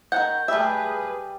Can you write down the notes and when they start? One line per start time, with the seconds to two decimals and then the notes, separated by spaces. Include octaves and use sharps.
0.12 D#3 F3 F#5 G6
0.48 G3 A3 G4 G#4 B4 E5